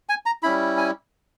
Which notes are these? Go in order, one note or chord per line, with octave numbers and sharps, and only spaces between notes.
G#5
A#5
G3 C#4 E4 B5
G#5